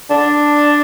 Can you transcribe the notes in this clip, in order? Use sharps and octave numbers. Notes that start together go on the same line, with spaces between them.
D4